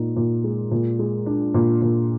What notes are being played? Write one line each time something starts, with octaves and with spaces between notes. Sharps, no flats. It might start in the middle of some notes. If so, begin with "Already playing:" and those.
Already playing: A#2 G#3 D#4
A#2
G#3
A#2
G#3
D4
A#2
A#2